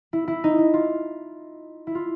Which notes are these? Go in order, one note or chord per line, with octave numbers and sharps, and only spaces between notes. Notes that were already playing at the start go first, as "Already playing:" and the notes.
E4
E4
D#4
E4
F4
E4
F4